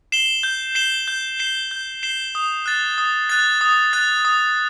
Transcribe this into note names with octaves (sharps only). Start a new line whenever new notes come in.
C7 E7 G7
G6
C7 E7 G7
G6
C7 E7 G7
G6
C7 E7 G7
D#6
F#6 A6
D#6
F#6 A6
D#6
F#6 A6
D#6